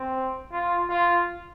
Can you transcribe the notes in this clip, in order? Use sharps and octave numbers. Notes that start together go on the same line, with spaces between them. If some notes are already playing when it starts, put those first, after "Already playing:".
Already playing: C4
F4
F4